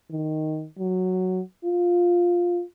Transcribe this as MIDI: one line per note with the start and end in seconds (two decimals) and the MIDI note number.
0.10 0.66 51
0.79 1.40 54
1.65 2.62 65